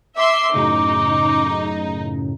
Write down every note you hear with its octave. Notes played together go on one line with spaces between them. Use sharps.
E5 C6 D6 E6
F#2 A2 C#3 D#4